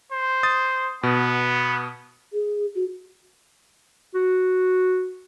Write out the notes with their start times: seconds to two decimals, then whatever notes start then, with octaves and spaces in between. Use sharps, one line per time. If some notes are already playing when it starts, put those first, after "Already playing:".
0.11 C5
0.43 D#6 A6
1.03 B2 B3
2.33 G#4
2.75 F#4
4.15 F#4